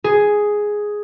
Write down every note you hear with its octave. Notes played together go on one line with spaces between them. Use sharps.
G#4